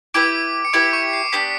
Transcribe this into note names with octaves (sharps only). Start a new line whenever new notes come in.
E4 G4 B4 D6 D7
C#7
E4 G4 B4 D6 D7
C#6 C#7
C7
B3 D4 G4 B6